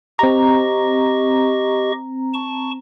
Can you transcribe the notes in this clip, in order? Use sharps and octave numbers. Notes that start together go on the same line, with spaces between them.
C4 G4 D#5 A#5 C#6
A5 C#6